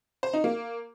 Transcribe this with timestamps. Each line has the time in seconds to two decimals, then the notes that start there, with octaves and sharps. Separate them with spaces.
0.23 C5
0.33 D#4
0.44 A#3